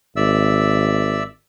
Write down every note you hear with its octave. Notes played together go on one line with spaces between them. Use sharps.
G#1 D5 E5 E6